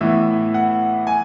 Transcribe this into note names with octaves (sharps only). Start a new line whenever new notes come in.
A2 E3 B3 E4 E5
F#5
G#5